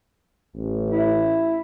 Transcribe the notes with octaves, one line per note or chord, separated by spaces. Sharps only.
A1
E4